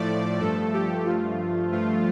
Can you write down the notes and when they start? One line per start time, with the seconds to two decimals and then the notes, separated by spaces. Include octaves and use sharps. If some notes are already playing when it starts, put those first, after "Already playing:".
Already playing: A2 F3 A3 D5
0.40 G2 F3 A3 A4
0.73 G4
1.05 G2 F3 A3 F4
1.72 G2 F3 A3 F4